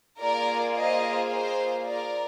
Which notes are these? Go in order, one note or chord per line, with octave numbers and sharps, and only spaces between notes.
A#3 F4 G#4 A#4 D5
C5 D#5
C5
A#4 D5